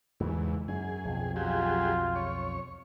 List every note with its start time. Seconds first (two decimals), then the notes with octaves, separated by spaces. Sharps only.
0.20 E2 G#2 C#3 E3
0.68 F#2 G#4
1.05 B1 F2
1.36 F#3 F4 G4 G#4
2.15 C#5